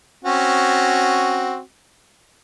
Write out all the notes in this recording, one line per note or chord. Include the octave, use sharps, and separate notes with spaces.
C4 C#4 F#4